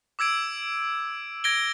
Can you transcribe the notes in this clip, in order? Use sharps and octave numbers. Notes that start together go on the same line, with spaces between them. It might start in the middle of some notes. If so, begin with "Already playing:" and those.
D6 E6 G#6 D7
G#6 A#6 D7 G7